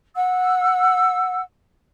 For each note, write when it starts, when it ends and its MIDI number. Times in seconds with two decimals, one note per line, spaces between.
0.15 1.39 78
0.15 1.39 88